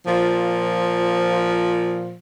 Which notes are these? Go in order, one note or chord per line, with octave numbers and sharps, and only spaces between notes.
A#2 F3